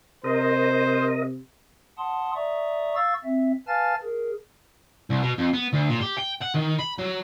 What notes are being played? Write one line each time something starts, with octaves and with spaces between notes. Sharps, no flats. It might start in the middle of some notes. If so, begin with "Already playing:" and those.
C3 A#4 C5 D#5
F#5 A5 C6 D#6
D5 E5 A#5 C#6 D#6
F5 C#6 E6 A6
C4 E5
B4 F5 G#5 A5 F6 A6
G#4 A#4
C2
B2
F2
B3
D2
A#2
G4
G5
F#5
D#3
B5
F#3